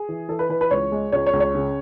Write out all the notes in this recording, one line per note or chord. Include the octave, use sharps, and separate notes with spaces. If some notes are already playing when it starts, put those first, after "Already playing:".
Already playing: G#4
E3
E3 A4
B4
E3 B4
B4
C#2 C#5
G#3
C#2 C#5
C#5
C#2
C#5
C#3